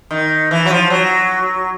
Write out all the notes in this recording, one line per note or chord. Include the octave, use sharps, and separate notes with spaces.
D#3
E3
F#3
F3
F#3